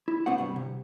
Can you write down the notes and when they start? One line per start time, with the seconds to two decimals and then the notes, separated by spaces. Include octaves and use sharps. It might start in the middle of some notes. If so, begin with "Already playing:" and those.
0.08 E4
0.26 A#2 B3 C4 D4 F#4 F#5
0.38 C2 G2 G3
0.56 C3